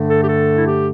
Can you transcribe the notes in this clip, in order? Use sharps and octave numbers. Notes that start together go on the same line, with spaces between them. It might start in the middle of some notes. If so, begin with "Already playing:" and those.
Already playing: G2 D3 A3
A4
G4
A4
E4
G4